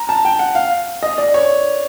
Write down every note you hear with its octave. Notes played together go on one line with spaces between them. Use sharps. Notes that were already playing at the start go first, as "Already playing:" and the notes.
Already playing: A#5
A5
G5
F#5
F5
D#5
D5
C#5